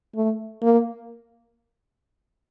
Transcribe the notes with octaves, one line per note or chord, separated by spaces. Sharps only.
A3
A#3